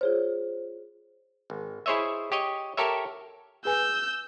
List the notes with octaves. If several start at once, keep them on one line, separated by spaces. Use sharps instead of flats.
F4 G#4 C5 C#5
G#1
E4 G#4 C5 C#5 D#5 E5
G4 C#5 D#5
G4 A4 A#4 C#5 E5
G#4 B4 G#5 E6 G6